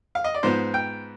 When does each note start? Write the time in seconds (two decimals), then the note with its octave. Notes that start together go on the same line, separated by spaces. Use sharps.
0.15 F5
0.24 D#5
0.34 D5
0.43 G#2 F3 B3 C5
0.74 G5